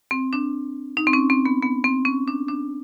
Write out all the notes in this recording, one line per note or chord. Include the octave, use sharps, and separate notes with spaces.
C4
D4
D#4
C4
C#4
C4
B3
B3
C4
C#4
D4
D4